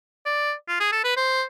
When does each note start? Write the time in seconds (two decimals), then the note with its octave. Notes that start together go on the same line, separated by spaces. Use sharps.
0.26 D5
0.68 F4
0.80 G#4
0.92 A4
1.04 B4
1.16 C5